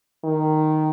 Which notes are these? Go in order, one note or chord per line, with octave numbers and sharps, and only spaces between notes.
D#3